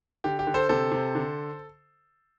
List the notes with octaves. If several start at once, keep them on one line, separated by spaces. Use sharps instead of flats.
D3 G4
G4
D3
A4 C5
C3 A4 C5
C3
D3